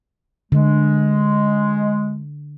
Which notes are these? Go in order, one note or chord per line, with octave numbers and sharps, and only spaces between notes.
D3 G#3